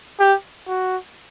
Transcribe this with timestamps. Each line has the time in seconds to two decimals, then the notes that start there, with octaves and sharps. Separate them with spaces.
0.20 G4
0.68 F#4